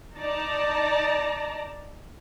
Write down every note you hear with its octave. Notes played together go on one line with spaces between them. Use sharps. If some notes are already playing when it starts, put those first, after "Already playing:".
D#4 D5 A5 A#5